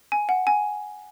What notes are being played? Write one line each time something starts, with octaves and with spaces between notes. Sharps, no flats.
G#5
F#5
G#5